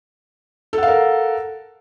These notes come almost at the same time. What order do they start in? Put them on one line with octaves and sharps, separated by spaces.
A4 F#5 F5 A#4